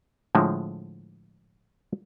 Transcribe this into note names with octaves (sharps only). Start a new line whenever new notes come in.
A2 D3 F3 G#3